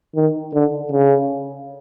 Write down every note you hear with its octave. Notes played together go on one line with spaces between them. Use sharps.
D#3
D3
C#3